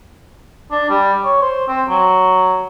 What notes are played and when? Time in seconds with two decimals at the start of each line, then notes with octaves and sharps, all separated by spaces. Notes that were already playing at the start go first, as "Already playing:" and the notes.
0.71 D4
0.89 G3
1.24 C#5
1.42 C5
1.68 C4
1.89 F#3